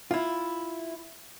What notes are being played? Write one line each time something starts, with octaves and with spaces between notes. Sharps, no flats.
E4 F4